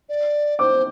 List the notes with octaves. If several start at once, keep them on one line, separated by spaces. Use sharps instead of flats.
D5
C5 D6